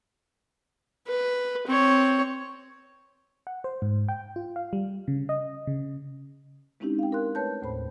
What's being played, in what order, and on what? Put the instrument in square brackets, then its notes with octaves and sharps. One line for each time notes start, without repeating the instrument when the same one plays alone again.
[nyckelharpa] B4
C4 C#5
[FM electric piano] F#5
C5
G#2
G5
F4
F5
G3
C#3
D#5
C#3
[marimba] G#3 C4 C#4 D#4 E4 G4
F5 G5
A#4 F5 C6 F#6
A3 B4 C#5 A5 G6
D#2 A2 C5 B5